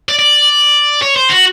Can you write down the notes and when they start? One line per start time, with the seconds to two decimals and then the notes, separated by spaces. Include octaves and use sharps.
0.09 D5
0.19 D5
1.02 C#5
1.16 C5
1.30 F#4